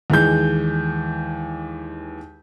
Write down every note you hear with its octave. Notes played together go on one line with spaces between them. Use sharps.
D#2 E3 G#3 G6